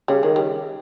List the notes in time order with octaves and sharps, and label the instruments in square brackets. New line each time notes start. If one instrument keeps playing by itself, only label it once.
[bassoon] C#3 [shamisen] G3
[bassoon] D#3 [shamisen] G#3
[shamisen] G3